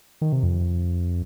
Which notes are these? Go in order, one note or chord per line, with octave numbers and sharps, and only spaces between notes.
D#3
C3
F2